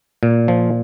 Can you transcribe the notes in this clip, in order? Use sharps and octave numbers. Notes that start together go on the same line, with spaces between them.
A#2
F3